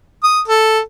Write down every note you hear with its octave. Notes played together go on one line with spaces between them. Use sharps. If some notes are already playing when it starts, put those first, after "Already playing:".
D#6
A4